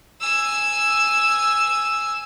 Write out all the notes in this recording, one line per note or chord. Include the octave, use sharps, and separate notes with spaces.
G#5 E6